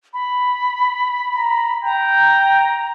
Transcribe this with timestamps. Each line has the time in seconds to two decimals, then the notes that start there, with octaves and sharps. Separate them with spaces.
0.14 B5
1.36 A#5
1.84 G5 A#5